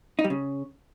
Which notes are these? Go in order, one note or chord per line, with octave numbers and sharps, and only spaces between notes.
D#4
G3
C#3